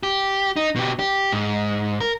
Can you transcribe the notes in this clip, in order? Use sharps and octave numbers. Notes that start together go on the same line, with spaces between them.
G4
D#4
B2 G4
G4
G#2
A#4